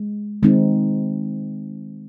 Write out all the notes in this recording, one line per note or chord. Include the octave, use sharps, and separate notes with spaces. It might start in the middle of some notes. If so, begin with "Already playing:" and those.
Already playing: G#3
D#3 G#3 C4 D#4